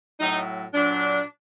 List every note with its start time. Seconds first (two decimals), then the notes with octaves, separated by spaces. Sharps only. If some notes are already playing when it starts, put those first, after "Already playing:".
0.20 A2 F#3 D#4
0.74 A#2 F#3 D4